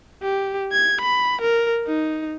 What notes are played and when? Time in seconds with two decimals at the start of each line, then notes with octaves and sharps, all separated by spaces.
0.22 G4
0.72 G#6
1.01 B5
1.41 A#4
1.87 D#4